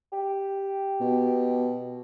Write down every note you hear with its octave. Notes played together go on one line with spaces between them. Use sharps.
G4
B2